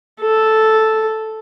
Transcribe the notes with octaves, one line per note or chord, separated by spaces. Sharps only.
A4